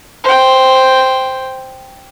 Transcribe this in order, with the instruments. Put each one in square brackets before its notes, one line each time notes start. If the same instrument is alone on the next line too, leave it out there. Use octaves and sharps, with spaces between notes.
[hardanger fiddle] C5 G5